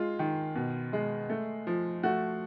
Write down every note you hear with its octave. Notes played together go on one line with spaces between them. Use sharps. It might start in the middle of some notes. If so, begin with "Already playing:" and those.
Already playing: G#3 F4
D#3
B2
G#3
A3
F3
A3 F#4